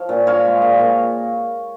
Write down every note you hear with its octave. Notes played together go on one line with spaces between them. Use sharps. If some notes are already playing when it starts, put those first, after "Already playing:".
Already playing: F3 C#5 F5
A#2
A#2 C#5 F5
G#3
A#2
A#2